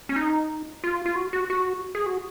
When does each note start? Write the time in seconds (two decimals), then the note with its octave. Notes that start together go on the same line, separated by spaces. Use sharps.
0.09 C#4
0.16 D#4
0.84 F4
1.06 F4
1.16 F#4
1.33 F#4
1.50 F#4
1.95 G#4
2.06 F#4